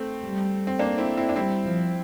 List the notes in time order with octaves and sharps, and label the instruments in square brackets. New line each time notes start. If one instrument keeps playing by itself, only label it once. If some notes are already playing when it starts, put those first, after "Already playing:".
Already playing: [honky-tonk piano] A3 C4
[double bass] G3
[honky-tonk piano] C4
A#3 D4
C4 E4
C4 E4
D4
[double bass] G3 [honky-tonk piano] C4 E4
[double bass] F3